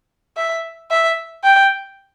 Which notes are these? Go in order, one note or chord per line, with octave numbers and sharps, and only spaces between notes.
E5
E5
G5